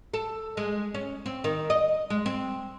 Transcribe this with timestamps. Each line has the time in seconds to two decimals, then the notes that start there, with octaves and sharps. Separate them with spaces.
0.14 A4
0.57 G#3
0.95 C#4
1.26 C4
1.44 D#3
1.70 D#5
2.10 G#3
2.26 C4